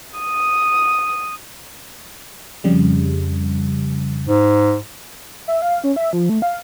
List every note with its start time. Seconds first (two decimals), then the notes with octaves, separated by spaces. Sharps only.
0.19 D#6
2.64 F2 C#3 G3
4.27 G#2
5.48 E5
5.62 F5
5.84 C#4
5.96 E5
6.13 F3
6.29 A3
6.42 F5